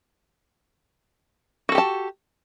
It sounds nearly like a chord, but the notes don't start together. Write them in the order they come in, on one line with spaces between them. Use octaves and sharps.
F#4 A4 G4 A5